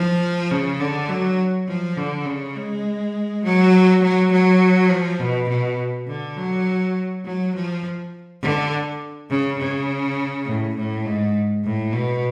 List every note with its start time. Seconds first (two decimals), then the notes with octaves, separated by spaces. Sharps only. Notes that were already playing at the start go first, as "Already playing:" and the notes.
Already playing: F3
0.51 C#3
0.80 D3
1.09 F#3
1.68 F3
1.97 D3
2.26 C#3
2.55 G#3
3.44 F#3
4.02 F#3
4.32 F#3
4.90 F3
5.19 B2
5.48 B2
6.08 D3
6.36 F#3
7.25 F#3
7.54 F3
8.41 D3
9.30 C#3
9.59 C#3
10.46 A2
10.76 A2
11.05 G#2
11.64 A2
11.93 B2